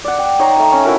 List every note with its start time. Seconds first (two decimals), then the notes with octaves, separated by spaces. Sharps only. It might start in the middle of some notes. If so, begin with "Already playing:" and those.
0.05 D5 F#5
0.19 G5
0.39 D#4 C#5 A#5 C6
0.57 A3 A#5
0.72 C#4
0.85 E4 F#4 A#4